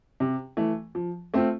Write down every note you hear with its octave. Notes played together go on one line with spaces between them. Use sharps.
C3
E3 A3
F3
A3 C4 F4